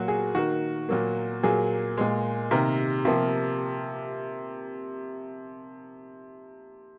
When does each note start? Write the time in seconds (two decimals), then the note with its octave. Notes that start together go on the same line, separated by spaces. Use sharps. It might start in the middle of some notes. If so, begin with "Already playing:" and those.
Already playing: A#2 F#3 A#3 F#4
0.08 G#4
0.35 D#3 A#3 F#4
0.89 A#2 F#3 A#3
1.43 A#2 F#3 A#3 G#4
1.97 A#2 G#3
2.51 C3 D#3 A#3 A#4
3.05 C3 F3 A#3